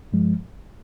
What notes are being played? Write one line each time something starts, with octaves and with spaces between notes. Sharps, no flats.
G2 F3 G#3